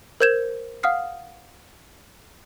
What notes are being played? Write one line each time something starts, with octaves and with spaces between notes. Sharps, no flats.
A#4 C5 G6 G#6 E7
F5 F#5 D#6 F6 C7